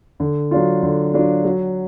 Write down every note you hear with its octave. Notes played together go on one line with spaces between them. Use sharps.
D3
F#3 D4 F4
D3
F#3 D4 F4
F#3